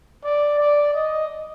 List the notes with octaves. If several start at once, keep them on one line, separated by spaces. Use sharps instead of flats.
D5
D5
D#5